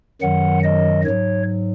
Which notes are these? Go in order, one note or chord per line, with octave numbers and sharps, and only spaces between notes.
F#2 D#3 F#3 F#5
D#5
G#2 F#3 C#5